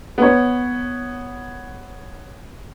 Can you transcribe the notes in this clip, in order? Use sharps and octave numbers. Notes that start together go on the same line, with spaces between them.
B3 C#5